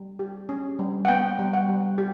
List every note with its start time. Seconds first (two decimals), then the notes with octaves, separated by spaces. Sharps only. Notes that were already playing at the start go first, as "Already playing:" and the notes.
Already playing: G3
0.19 G4
0.49 C#4
0.79 G3
1.05 F#5
1.08 B3 G5
1.39 G3
1.53 F#5
1.68 G3
1.98 F#4 G4